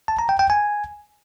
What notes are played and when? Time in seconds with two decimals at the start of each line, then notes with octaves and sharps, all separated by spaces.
0.08 A5
0.19 A#5
0.29 G5
0.39 G5
0.50 G#5